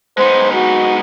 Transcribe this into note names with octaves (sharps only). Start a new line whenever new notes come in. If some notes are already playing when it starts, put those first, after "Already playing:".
G#3 B3 D#4 C5
F#4